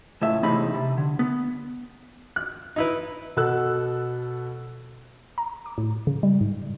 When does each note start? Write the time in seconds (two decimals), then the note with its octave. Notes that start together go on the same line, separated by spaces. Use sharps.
0.22 C#2 A2 E5
0.43 E2 A2 C3 D#4 B5
0.74 C3
0.98 D3
1.19 B3
2.36 F#6
2.76 D#4 E4 B4
3.37 B2 A4 F#5 E6 F#6
5.38 A#5
5.66 D6
5.78 A2
6.07 C#3
6.23 G3
6.41 G#2